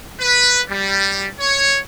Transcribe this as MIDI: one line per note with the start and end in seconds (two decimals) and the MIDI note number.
0.20 0.61 71
0.70 1.27 55
1.39 1.78 73